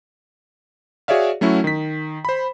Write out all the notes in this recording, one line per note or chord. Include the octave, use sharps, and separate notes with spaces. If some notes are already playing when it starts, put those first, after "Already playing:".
F#4 G#4 C#5 D5 E5 F5
F#3 A3 C#4 E4 F#4
D#3 B6
C5 B5